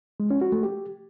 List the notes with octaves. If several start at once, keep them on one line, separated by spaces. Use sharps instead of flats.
G#3
C#4
F#4
A3
G4